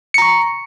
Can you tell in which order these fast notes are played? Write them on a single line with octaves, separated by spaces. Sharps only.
C#7 A#5 C#6